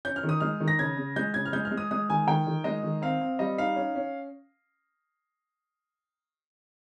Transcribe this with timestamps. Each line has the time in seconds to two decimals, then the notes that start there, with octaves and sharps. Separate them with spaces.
0.05 C#4 G6
0.16 F6
0.23 D#3
0.29 D#6
0.40 G#3 F6
0.60 D#3
0.68 A#6
0.79 C#3 G#6
0.97 C#3
1.16 G#3 G6
1.34 C#3 G#6
1.45 F6
1.53 G#3 G6
1.65 F6
1.71 G#3
1.77 D#6
1.91 G#3 D#6
2.09 D#3 G#5
2.27 D#3 G5
2.47 D#3
2.64 G#3 D#5
2.83 D#3
3.02 C4 F5
3.21 C4
3.39 G3 D#5
3.58 D#4 F5
3.76 C#4
3.95 C#4